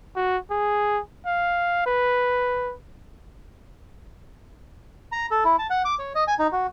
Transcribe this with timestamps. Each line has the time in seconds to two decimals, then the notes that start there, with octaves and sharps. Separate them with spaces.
0.15 F#4
0.50 G#4
1.26 F5
1.86 B4
5.12 A#5
5.31 A4
5.44 E4
5.59 A5
5.70 F#5
5.85 D6
5.99 C#5
6.15 D#5
6.28 G#5
6.39 D#4
6.52 F#4